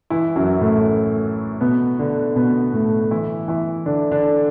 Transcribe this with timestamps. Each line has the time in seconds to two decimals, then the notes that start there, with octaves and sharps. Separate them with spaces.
0.10 E3 E4
0.36 F#2 F#3
0.61 A2 A3
1.61 B2 B3
1.99 D3 D4
2.36 B2 B3
2.73 A2 A3
3.11 E3 E4
3.48 E3 E4
3.85 D3 D4
4.11 D3 D4